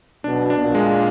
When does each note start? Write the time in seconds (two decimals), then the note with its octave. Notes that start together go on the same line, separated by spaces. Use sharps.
0.24 B1 B2 D4
0.50 D4
0.62 A#2
0.74 G#3